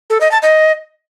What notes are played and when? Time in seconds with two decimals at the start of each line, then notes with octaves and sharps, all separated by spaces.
0.10 A4
0.21 D#5
0.32 A5
0.42 D#5